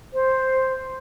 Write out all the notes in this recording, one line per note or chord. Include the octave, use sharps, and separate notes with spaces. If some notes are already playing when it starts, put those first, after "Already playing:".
C5